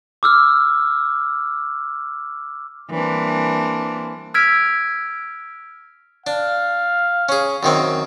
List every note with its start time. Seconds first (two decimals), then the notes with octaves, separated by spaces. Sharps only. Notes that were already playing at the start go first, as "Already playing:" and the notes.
0.23 D6 E6 F6
2.91 E3 G3 A#3 C4 D4
4.34 E6 F6 G#6 B6 D7
6.27 D4 F5
7.29 C#4 G#4
7.63 F#2 D#3 C4